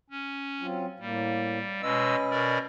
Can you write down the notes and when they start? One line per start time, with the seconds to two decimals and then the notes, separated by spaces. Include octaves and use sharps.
0.10 C#4
0.61 F#3 C4 F4
1.00 A2 G3 A#3
1.82 B2 G#3 C#4 B4 D#5 E6
2.31 B2 A#4 D5